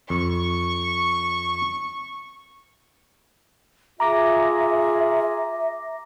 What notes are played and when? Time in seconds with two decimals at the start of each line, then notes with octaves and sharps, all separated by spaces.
0.10 F2 C#6
4.00 F4 G#4 E5 A#5 D6 A#6